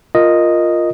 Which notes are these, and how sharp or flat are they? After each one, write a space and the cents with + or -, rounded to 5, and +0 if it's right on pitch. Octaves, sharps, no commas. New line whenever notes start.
F4 +0 A#4 +0 D#5 +0